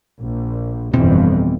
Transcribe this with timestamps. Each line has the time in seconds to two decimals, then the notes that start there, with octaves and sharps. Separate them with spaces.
0.21 A#1
0.93 G1 F2 B2 E3 C4